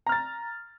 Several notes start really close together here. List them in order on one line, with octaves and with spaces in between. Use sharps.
A#5 F6 A6